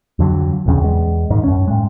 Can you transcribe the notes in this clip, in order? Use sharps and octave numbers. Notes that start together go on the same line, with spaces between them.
F2 D3 F#3
D#1 B1 F2 C#3
E2 G#3
A#1 G#2 D#3
F#2 C#4
A2 G#3